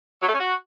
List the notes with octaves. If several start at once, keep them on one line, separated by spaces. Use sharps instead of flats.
F#3
A3
C#4
F#4